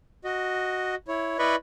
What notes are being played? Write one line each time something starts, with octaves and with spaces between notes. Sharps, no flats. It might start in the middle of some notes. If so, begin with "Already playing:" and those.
F#4 D#5
E4 C#5
E4 B4 D5 D#5 B5 C#6